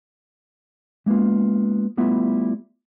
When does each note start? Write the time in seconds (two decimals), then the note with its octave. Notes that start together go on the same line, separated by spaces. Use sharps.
1.06 G#3 A#3 B3 C#4 F4
1.97 G3 A3 B3 E4 F4 E5